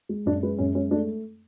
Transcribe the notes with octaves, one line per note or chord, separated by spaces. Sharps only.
G#3
F#2 D4
G#3 B4
F#2 C#4
G#3 C#4
A3 D4